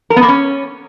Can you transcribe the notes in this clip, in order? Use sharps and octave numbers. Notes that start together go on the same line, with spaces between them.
A#4
B3
A#3
C#4